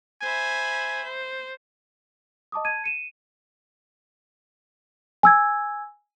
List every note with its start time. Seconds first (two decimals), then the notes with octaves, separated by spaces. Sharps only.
0.22 C5 E5 G#5 B5
1.04 C5
2.52 D#5 A5 D6 D#6
2.65 A5 G#6 D#7
2.84 C#7 D#7 E7
5.23 G#5 E6 G#6